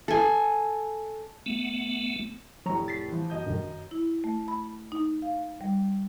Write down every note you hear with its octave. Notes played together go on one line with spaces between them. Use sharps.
A4 G#5
A3 B3
F1 A2 F#3 A#5 C#6
A6 B6 C7
E3 F3
F#2 D#5 G6
G2 B2 D#3
E4
A3
B5
D#4
F5
G3